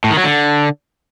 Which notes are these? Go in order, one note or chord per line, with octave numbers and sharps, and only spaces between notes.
A2
D#3
F#3
D3